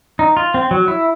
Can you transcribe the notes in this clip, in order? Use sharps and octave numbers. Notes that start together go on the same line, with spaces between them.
D#4
F4
C4
F#3
E4